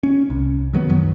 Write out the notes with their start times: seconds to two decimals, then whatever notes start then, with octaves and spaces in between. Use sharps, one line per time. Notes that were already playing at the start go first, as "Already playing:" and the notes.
0.03 C#4
0.30 C2
0.73 D#3 F#3 G#3 B3
0.89 F#2 D#3 F#3